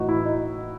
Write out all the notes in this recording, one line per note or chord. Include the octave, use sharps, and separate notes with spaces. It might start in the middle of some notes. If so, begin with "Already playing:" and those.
Already playing: A2 E3 D#4 F#4
E4
D#4